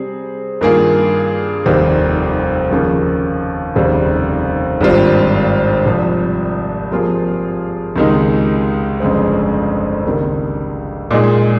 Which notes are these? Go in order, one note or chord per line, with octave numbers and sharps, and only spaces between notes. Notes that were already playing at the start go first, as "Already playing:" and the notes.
Already playing: C3 G3 C4 G#4
G2 D#3 A#3 F4 G#4
F1 D#2 D#3 G3 C4
D#2 C#3 F3 A#3 C#4
F1 D#2 C#3 G3 C4
G#1 G2 G3 C4 F4
C2 C3 F3
C3 F3 A#3 F4 G#4
C#2 C3 D#3 G#3 D#4
G1 F2 C#3 G#3 C4
C#2 C3 D#3 A#3
A#2 G#3 D#4 G#4